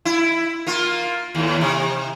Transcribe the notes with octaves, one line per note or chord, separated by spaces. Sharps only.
E4
A#3 F4
D#2 A2
C3